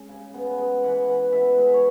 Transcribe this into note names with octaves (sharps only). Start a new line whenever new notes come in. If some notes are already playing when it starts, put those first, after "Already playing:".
Already playing: G#3 C#4
C#3
B3
G#3
E3 F#5
E3
B3 E5
G#3
C#5